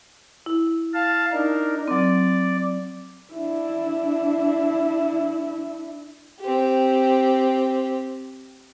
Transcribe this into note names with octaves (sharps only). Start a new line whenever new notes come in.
E4
F5 A5
D4 D#4 A#4
F#3 C4 D5
D4 E4
C4 G4